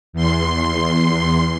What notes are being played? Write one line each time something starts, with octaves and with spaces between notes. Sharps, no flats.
E2 C6